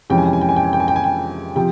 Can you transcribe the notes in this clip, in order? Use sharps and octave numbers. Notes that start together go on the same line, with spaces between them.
F2 C3 E3 G#3 C#4 G5
G#5
G5
G#5
G5
G#5
G5
G#5
G5
G#5
G5
G#5
G5
C3 F3 G5